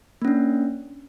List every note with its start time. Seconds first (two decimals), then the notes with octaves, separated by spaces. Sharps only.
0.22 A#3
0.25 C#4
0.28 D4